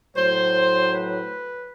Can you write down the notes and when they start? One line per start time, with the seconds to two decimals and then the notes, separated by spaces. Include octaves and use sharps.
0.15 A2 F#3 C5
0.92 B4